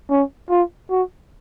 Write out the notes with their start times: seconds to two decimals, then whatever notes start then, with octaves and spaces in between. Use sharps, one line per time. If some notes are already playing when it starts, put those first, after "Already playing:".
0.10 C#4
0.50 F4
0.90 F#4